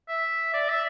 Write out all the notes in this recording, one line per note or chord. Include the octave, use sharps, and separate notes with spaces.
E5
D5
E5